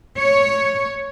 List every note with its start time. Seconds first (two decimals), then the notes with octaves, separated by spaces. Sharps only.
0.17 C#5